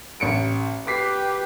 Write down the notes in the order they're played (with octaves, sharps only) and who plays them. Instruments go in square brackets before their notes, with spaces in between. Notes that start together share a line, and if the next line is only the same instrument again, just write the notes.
[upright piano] A1 C#7 D7
[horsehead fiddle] G4 B4 [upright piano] D6 B6 C7